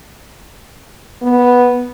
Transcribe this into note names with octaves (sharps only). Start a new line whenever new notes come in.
B3